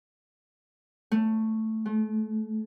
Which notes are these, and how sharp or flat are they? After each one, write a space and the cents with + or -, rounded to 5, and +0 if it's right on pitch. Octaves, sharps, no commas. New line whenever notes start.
A3 +5
A3 -35